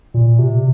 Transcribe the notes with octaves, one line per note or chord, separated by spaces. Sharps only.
A#2
C3